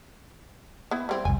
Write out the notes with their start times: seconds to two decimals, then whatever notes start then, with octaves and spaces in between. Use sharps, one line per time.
0.91 B3 E4
1.09 G3 C4 E4
1.25 F1 C2 G#5